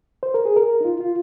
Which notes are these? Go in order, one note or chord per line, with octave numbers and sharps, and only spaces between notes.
C5
A#4
G#4
A#4
D#4
F4
F4